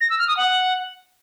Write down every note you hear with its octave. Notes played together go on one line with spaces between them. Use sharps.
A#6
E6
F6
D#6
F#5